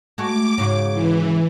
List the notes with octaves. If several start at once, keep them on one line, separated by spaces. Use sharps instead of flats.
G#3 A3 F#4 D6
G#2 C#3 F#4
E3